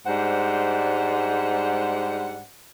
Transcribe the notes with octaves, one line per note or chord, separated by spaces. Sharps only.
G#2 G3 G#3 D4 C5 F#5